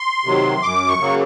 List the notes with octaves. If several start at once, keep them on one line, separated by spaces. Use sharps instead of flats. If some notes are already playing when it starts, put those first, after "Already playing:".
Already playing: C6
C3 D#3 F#3
F#2 D6
C#6
C#3 F#3 A#3